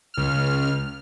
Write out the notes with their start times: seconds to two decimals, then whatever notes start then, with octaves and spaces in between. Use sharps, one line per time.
0.14 C#2 F6